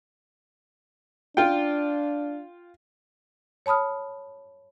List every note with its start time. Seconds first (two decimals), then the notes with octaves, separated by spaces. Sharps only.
1.37 D4 F4 G5
3.66 C#5 A5 B5 D#6 F6